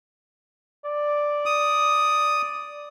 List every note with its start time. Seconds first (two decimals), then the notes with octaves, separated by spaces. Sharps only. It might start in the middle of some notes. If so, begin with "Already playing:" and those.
0.86 D5
1.46 D#6